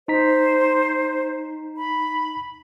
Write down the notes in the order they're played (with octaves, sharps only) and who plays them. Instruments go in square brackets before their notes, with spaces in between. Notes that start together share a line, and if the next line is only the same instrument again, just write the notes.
[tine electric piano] D#4 A#5 B6 [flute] C5
[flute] B5